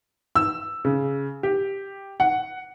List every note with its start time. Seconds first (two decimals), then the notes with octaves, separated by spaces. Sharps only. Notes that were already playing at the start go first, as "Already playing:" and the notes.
0.36 E6
0.85 C#3
1.43 G4
2.20 F#5